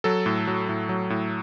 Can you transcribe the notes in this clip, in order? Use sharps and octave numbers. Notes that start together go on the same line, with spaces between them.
F#3 A4
A2
F#3
A2
F#3
A2